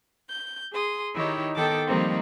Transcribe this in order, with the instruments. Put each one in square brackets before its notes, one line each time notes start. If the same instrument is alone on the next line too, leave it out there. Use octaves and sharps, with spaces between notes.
[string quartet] G6
G#4 C6 D#6
D#3 D#4 E4 G4 C#5
D#3 B3 A4 G5 A5 D6
D#3 F3 G3 A#3 C4 D#4